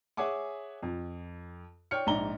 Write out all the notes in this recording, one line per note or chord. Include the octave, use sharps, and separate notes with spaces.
G#4 C#5 E5 F#5 G#5 D6
F2
C#5 D5 G5 F6 C#7
A#1 G#2 D5 A#5 G7